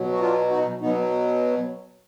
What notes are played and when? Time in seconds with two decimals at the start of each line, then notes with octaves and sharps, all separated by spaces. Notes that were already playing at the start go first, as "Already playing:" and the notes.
Already playing: B2 F#3
0.13 F#4
0.20 D4 F4
0.50 D#4 F#4
0.81 B2 F#3 B3 D#4